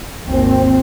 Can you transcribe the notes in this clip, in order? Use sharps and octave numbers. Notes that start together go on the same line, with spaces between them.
G#1 D#2 C4